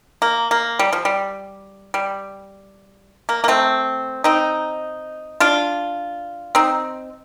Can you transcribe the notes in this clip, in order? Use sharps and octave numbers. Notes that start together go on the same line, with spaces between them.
A#3
A#3
G3
F3
G3
G3
A#3
A#3
A3 C4
C4 D#4
D4 F4
C4 D#4